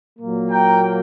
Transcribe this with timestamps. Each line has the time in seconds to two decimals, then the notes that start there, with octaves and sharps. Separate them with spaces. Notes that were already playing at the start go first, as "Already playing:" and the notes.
0.19 A#2 F#3 A#3
0.49 G5 A#5